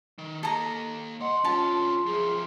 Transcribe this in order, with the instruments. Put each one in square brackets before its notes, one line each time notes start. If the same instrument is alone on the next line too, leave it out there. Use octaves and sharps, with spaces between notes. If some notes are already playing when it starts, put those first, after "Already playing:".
[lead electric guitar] D#3
[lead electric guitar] A#3 D#5 [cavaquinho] A4 A#5
[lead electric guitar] C2 F#5 [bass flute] D#5 [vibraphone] C6
[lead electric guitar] D2 C#4 [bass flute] F4 [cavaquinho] A5
[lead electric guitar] F#2 F3 [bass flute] G#4